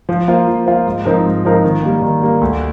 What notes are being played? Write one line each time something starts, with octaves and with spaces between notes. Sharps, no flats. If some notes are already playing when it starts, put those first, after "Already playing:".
F3
A#3 F4 C5
F3
A#3 F4 C5
G#2
F3 C4 D#4 A#4
G#2
F3 C4 D#4 A#4
D#3
G3 A#3
D#3
G3 A#3
D2